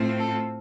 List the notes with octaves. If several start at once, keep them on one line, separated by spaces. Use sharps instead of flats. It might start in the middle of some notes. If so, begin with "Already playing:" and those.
Already playing: A2 A3 C4 F4
A4